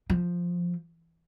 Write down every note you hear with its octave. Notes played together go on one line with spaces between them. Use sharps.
F3